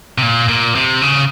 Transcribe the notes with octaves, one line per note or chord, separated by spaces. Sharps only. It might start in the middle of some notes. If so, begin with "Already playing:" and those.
C3
A#2
A#2
C3
C#3